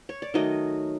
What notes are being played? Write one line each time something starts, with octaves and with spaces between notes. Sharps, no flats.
C#5
D5
D#3 F#3 A3 D#5